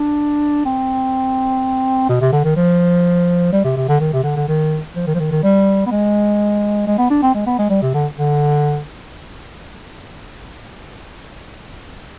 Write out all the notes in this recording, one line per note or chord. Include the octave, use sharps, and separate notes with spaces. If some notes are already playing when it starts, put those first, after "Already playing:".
Already playing: D4
C4
B2
C3
D3
D#3
F3
G3
C3
C3
D3
D#3
C3
D3
D3
D#3
F3
D#3
F3
D#3
D#3
G3
B3
G#3
G#3
B3
D4
C4
G#3
B3
G#3
G3
C3
D3
D3